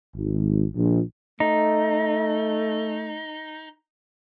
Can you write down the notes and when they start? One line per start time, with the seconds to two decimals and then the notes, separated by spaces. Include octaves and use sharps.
0.16 G#1
0.76 A#1
1.40 A3 D#4